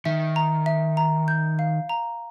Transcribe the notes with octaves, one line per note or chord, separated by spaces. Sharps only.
D#3 E5
A#5
E5
A#5
G6
F5
A#5